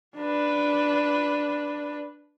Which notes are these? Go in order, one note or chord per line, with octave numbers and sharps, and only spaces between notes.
D4 B4